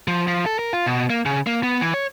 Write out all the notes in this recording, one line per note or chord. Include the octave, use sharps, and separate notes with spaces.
F3
F3
A4
A#4
F4
B2
A#3
C#3
A#3
B3
E3
C#5